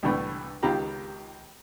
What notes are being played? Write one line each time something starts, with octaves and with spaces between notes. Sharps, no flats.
C2 A2 D3 E3 A3
C#2 D#3 F4 G4 A#5 B5